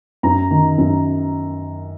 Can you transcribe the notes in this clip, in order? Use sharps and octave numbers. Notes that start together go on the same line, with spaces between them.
F#2 A#5
D#3
F#2